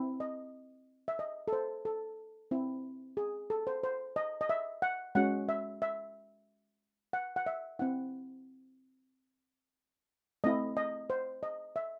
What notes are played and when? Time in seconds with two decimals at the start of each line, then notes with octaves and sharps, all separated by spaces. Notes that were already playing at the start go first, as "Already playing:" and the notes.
Already playing: C4 E4
0.20 D#5
1.08 E5
1.19 D#5
1.48 A4
1.53 C5
1.85 A4
2.51 C4 E4
3.17 G#4
3.50 A4
3.67 C5
3.83 C5
4.16 D#5
4.41 D#5
4.49 E5
4.82 F#5
5.15 G#3 C#4 F#4 F#5
5.49 E5
5.82 E5
7.13 F#5
7.36 F#5
7.46 E5
7.79 C4 E4 F#5
10.44 A3 C4 E4 D#5
10.77 D#5
11.10 C5
11.43 D#5
11.76 E5